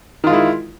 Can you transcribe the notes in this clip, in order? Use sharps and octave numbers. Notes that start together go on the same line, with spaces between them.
D#3 G#3 E4 F4